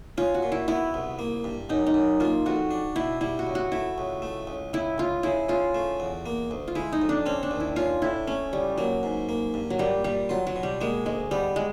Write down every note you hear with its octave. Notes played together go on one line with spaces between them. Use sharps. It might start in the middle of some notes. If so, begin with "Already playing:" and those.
C#4 F4
F#4
A#2
E4
B3 E4
C2
A#3
G2
F#2 D#4
D#4
F#2
A#3 F4
F2 F#4
D4
B2 E4
G3 E4
F#4
C#2
F#4
A3 E4
C#2
A3
C#2
C#2 E4
C#2 F4
C#3 E4
C#3 F4
A3
E2
A#3
D2
F4
G#3 E4
D#4
F2
D4
C4 C#4
D4
D#2
E4
C#4 F4
A2 E4
A3 C#4
C#2 G3
F#3 A#3
G#2
A#3
G2
F#3
A#2 G3
A#2 G3
F#3 F4
F#3
B2
G3
G#3 A#3
D2 G#3
G3 B3
G#3